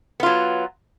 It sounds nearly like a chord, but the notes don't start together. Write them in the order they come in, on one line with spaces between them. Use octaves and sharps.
B3 F4 F#3